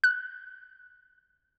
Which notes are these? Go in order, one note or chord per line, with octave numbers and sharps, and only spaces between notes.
F#6